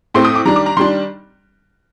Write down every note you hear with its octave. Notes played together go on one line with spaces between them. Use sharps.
A2 A3 C4 C6
D#6
D6
D#3 G3 D4 A#5
D6
A#5
D#3 G3 D4 C6